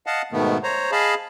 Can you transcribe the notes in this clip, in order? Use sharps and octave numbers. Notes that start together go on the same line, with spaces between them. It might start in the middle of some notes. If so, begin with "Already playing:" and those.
D#5 F5 F#5 A5
G#2 B2 D#3 A3 B3
C5 C#5 A#5
G#4 D#5 F5 A5 B5